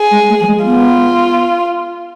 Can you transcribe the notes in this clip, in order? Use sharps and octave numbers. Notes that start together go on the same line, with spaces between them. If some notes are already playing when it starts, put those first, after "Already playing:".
Already playing: G#4
G#3
A3
F3
G#3
B3 F4